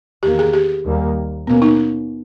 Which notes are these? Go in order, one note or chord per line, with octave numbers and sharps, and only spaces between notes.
E2 D#3 A#3 G4
G#4
G4
D#2 D#3 G3 A#3
B2 A#3 B3 C#4
D#4